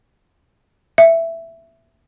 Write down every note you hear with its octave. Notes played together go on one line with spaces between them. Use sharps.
E5